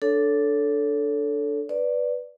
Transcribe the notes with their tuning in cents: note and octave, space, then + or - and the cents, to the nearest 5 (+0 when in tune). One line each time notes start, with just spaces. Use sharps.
D4 +0 A4 +0 C#5 +30
B4 +0 D5 +0